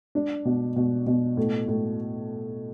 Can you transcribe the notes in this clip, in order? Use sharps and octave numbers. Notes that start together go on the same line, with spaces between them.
D4
B2
B2
B2
A2
A2